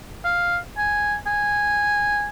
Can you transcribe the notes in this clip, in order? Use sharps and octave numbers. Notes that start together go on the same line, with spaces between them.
F5
G#5
G#5